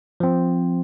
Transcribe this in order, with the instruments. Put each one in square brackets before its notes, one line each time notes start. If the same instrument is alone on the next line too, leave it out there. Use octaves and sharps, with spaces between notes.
[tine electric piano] F3 C4